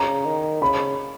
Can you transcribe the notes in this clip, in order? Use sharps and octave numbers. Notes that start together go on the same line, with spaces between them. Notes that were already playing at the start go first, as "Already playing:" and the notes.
Already playing: C#3 A#5
D#3
C#3 B5